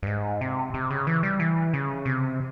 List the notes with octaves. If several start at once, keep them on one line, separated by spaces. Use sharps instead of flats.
G2
G#2
C3
C3
C#3
E3
G3
E3
C#3
C3